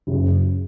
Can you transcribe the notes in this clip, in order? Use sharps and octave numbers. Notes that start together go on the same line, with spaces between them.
F#1 F#2 C#3